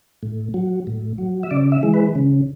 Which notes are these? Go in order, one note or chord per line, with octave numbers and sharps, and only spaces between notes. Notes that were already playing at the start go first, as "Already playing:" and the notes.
A2
F#3
A2
F#3
E5
C#3 D5
E5
E3 G#3
B4
C#3